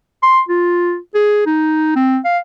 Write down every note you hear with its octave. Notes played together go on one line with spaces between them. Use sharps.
C6
F4
G#4
D#4
C4
F5